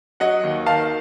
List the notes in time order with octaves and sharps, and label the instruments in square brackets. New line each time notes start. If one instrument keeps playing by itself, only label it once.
[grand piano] F#3 D#5 F#5
D#2
D#3 F5 A5